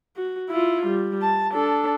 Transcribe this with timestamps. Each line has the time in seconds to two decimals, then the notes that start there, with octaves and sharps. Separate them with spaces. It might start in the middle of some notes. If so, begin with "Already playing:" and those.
0.16 F#4
0.49 E4 F4
0.86 G3
1.22 A5
1.53 D4 A4